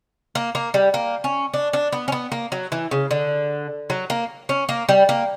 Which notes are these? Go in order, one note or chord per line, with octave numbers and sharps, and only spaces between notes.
A#3
A#3
G3
A#3
C#4
D4
D4
B3
C#4
B3
A#3
F#3
E3
C#3
D3
F#3
A#3
C#4
A#3
G3
A#3